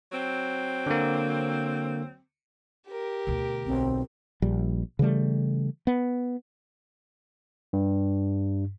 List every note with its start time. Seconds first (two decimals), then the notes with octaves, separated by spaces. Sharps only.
0.12 F#3 C4
0.86 D3 A#3
2.88 G4 A#4
3.27 D2 B2
3.67 B1 C4
4.42 A#1 G3
4.99 C#3 E3 G3 A3
5.87 B3
7.73 G2